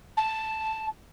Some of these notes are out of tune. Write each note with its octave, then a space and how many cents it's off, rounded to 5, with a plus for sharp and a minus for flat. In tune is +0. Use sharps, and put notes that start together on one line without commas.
A5 +0